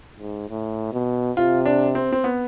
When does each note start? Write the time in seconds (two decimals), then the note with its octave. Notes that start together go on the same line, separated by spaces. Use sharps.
0.20 G#2
0.49 A2
0.93 B2
1.37 C3 F4
1.66 D4
1.95 C4
2.12 C4
2.24 B3